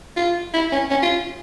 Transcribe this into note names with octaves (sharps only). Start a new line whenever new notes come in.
F4
E4
C#4
C#4
F4